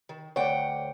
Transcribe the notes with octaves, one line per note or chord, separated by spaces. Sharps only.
D#3
D2 C#5 D5 F#5 G5